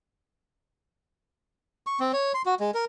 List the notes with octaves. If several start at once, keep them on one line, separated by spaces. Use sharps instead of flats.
C#6
C4
C#5
C6
F#4
G#3
A#4